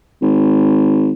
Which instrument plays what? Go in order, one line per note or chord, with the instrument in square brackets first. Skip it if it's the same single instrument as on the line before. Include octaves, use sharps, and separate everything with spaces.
[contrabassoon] G#1